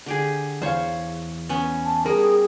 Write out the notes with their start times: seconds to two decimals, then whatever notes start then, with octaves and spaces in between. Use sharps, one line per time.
0.06 D3 G4 G#4
0.62 E2 C5 C#5 F5
1.49 B3 C#4
1.85 A5
2.06 G3 G#4 A#4